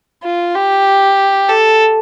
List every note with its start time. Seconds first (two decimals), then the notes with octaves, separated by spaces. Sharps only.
0.23 F4
0.55 G4
1.49 A4